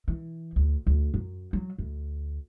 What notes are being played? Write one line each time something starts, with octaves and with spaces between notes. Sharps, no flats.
E3
D2
D2
F#2
F#3
D2